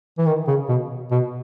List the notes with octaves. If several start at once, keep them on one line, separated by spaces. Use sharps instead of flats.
E3
D#3
C#3
B2
B2